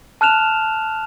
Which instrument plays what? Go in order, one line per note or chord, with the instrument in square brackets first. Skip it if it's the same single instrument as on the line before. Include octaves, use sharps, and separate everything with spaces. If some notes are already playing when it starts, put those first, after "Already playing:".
[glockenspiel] A5 F6 F#6 E7 F7